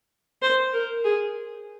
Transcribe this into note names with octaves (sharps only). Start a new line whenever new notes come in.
C5
A#4
G#4